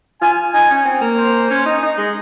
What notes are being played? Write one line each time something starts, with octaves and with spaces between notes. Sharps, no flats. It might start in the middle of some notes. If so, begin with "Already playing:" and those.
F4 G#5
D#4 G#5
C#4
C4
A#3
C5
C#4
D#4
D#4
G#3